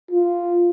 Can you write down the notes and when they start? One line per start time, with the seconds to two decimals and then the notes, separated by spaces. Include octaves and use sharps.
0.11 F4